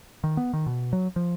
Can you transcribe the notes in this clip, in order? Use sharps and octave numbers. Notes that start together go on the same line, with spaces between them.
D#3
B3
D#3
B2
F#3
F3